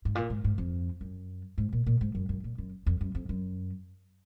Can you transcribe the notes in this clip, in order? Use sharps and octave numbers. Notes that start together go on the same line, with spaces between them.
G#2
A#2
G#2
G#2
F2
F#2
G#2
A#2
A#2
G#2
F#2
F#2
A#2
F#2
F2
F#2
F2
F#2